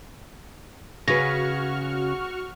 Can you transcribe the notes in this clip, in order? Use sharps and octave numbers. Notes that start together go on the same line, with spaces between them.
C#3 F#4 G#4 B4 C#6 F6 A#6